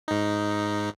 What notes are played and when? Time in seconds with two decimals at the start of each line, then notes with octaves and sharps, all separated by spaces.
0.08 G#2 D#4